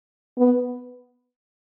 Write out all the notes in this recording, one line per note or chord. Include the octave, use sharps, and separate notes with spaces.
B3